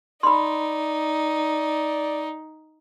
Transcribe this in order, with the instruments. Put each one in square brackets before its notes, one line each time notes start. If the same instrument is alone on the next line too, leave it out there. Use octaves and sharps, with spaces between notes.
[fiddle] D#4 [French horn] D5 [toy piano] B5 C6